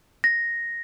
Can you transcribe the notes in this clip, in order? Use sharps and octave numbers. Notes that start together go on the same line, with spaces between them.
A#6